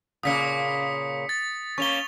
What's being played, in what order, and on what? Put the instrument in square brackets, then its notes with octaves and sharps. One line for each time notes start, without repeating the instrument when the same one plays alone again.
[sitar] A#2 C#3 A#3 [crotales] D#6 B6 C#7
[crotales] A6
[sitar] A#3 C#4 [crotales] C#6 F7 G7